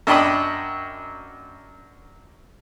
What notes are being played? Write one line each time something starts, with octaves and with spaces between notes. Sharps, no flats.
F#2 D4 D#5 G5 B5 D#6